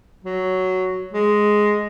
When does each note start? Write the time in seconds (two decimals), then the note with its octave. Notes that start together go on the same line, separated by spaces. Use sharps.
0.24 F#3
1.13 G#3